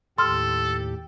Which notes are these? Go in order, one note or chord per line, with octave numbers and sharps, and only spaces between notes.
D#2 A2 G4 A4 C6 F6